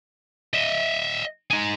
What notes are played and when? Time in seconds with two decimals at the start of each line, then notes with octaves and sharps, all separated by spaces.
0.53 D#5 E5
1.50 D#4 G#4